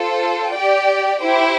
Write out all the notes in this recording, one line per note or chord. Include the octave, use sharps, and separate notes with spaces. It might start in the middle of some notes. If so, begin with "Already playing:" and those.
Already playing: F4 A4 C5
G4 D5 G5
E4 G4 C5 G5